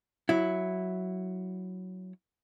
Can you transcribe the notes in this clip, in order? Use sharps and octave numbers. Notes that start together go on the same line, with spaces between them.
F#3 E4